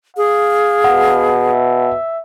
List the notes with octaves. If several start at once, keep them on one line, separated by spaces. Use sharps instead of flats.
G#4 F5
B2 F#5
E5